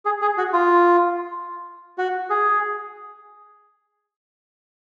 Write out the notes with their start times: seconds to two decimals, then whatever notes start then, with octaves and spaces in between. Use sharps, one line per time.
0.05 G#4
0.22 G#4
0.38 F#4
0.53 F4
1.98 F#4
2.30 G#4